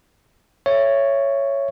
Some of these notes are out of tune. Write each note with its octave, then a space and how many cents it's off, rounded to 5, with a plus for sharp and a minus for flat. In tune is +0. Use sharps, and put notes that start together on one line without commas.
C#5 +0 E5 +20